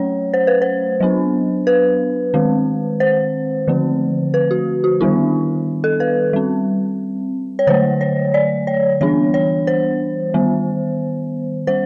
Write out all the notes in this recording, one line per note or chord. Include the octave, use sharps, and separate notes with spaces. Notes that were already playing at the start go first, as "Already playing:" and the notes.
Already playing: F#3 A3 C#4 C#5
C5
B4
C5
F#3 B3 D4
B4
D#3 G#3 C4
C5
D3 F3 A3 C4
B4
F#4
F#4
D#3 G3 B3 D4 E4
A4
B4
G3 C4
C#5
D3 F#3 A3 C5
C#5
D5
C#5
E3 G3 B3 D4 C#5
C#5
C5
D#3 G3 B3
G3 C5